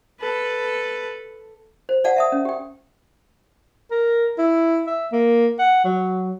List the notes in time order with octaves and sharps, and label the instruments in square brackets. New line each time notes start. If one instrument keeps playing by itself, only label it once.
[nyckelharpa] A4 B4
[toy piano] C5
D5 F5 F#5 A5
E5 A5 D#6
C#4
G4 G5
[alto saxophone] A#4
E4
E5
A#3
F#5
F#3